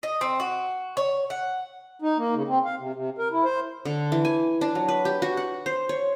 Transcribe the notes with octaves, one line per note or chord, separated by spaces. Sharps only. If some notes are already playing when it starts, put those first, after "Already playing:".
D#5
C4
F#4
C#5
F#5
D#4
A#3
C#3
C4
F5
C3
C3
A#4
E4
C5
D3
E3
G#5
D4
F#3
B4
G4
F#4
F#5
C5
C#5